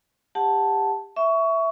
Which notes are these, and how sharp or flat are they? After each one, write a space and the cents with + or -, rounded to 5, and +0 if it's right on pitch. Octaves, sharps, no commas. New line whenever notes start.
G4 +25 F#5 +0 A5 +0
E5 +0 C#6 +20